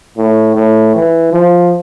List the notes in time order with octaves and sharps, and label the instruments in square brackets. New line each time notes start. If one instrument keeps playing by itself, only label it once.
[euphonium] A2
A2
E3
F3